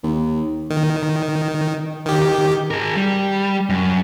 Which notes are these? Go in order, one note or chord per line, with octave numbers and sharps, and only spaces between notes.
D#2
D#3
D#3 G4
G#4 A#4
G3
F#2